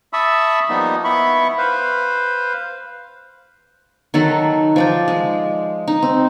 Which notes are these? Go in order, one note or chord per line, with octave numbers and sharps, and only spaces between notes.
E5 A5 B5 C#6 D#6 E6
F3 G3 A#3 B3 D#4
B3 E4 B5 C#6
B4 C5 F5
D#3 F#3 A4 F#5
F3 D5 G5
G#3
D#4
C4